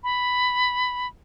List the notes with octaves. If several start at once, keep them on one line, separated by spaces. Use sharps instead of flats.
B5